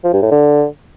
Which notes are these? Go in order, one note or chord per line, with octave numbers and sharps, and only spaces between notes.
F3
G2
A2
D3